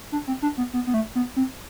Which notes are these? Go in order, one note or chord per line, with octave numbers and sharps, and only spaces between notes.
D4
C4
D4
B3
B3
B3
A3
B3
C4